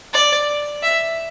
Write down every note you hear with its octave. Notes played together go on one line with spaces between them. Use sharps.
D5
E5